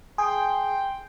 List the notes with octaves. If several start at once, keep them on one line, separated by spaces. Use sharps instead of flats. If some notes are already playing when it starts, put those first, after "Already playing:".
G#4 G5 C6